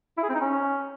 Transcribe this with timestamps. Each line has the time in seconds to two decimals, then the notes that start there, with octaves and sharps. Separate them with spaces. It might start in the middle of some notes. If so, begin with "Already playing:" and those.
0.18 E4
0.23 G#4
0.29 C4
0.35 D#4
0.40 C#4